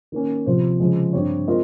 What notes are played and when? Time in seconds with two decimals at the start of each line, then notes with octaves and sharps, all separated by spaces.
0.12 D#3 A#3 C#4
0.46 C3 F3 C4 F4 C5
0.80 C#3 F3 G#3
1.13 G2 G3 C4 G4 C#5
1.47 G#3 C4 F4 A#4 D#5